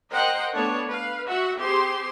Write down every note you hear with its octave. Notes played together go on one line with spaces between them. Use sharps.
A#4 C5 D#5 F#5 G5
A3 B3 D4 A4 C#5
B4 F5
F#4 E5 F#5
C4 G4 G#4 C5 C6